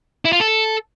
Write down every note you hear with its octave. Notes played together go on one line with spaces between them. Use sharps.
E4
F4
A4